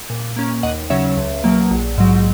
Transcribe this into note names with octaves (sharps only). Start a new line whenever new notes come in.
A#2
A#3 C#4
D#2 D#5 F#5
C#3 F#3 C#4 C#5 E5
C#2
B2 F#3 A#3
A#1
G#2 F#3